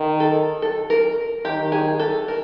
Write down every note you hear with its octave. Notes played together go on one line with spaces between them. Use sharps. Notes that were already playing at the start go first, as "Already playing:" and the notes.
Already playing: D#3
A4
A4
A#4
D#3 G4
G#4
A4
A#4